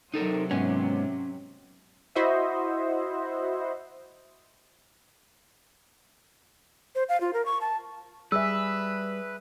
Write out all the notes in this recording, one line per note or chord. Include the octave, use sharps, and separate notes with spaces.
C3 F#3 D#4 A4 A#4
G#2 B3 C#4
E4 F#4 C5 D#5 E5
C5
F5
F4
A#4
C#6
A5
G3 G#4 B4 E5 E6